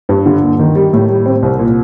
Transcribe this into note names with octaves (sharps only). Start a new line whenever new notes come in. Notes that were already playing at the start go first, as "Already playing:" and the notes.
G2
D3
D#2
D#3
G3
A2
G3
C4
C2
A#2